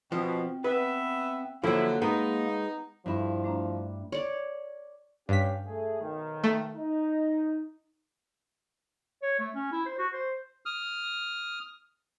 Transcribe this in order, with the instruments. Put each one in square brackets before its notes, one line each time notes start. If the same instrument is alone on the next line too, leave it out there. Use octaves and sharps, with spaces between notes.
[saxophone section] B2 [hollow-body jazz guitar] F3 [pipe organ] C4
[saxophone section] B3 E5 [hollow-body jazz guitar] B4
[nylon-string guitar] D3 F#3 [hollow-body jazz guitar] F3 [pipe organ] A#3 [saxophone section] E4
[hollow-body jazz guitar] G#3 [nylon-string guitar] B3 [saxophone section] D#4
[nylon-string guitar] G2 E4 [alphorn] F3
[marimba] A3 D4 A#5
[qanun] C#5 D5
[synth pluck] G2 B6 [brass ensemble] C#4 G4 F5
[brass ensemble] A3 G#4
B1 D#3
[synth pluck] A3
[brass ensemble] D#4
[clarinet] C#5
A3
C#4
E4
C5
F#4
C5
[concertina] D#6 F6